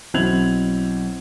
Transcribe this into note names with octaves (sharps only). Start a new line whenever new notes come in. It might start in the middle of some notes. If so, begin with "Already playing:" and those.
B1 C4 E4 G#6 F7 F#7